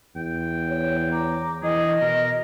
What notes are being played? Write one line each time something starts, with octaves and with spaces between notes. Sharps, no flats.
E2 G5
C#5
A#5 D6
E3 G#4 D#5
B2 A#4